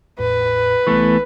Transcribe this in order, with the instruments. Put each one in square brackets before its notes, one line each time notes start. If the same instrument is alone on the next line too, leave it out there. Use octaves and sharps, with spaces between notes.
[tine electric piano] G#1 E2 A2 [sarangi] B4
[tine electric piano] C2 C#6 [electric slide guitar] E3 A3 B3